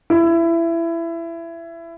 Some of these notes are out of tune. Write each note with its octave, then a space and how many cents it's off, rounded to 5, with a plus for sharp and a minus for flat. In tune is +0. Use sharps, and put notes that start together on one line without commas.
E4 +20